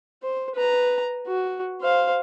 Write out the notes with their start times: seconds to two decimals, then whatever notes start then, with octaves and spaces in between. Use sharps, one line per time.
0.23 C5
0.55 B4 A#5
1.27 F#4
1.81 C5 F5